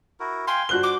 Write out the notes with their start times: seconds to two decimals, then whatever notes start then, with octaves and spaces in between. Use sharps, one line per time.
0.20 E4 F#4 A#4
0.47 F5 G5 G#5 C6
0.69 D4 F#4 C5 F#6 G7
0.83 D6